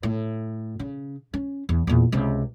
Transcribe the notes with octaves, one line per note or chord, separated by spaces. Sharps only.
A2
C#3
C#4
E2
E2 A#2
C#2 C3